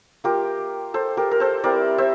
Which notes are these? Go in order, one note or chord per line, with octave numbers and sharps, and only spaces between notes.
A#3 F4 G4 A#4
A4 C5
G4 A#4
A#4
A4 C5
G3 C4 E4 A#4 D5
C5 E5